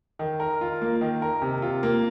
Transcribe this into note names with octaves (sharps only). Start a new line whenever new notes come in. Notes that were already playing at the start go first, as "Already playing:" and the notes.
D#3
A#4
F4
A#3
D#3
A#4
C3
F4
A#3